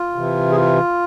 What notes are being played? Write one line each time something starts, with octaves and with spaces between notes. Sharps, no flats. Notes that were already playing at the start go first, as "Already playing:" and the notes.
Already playing: F4
C3 E3
G#4
F4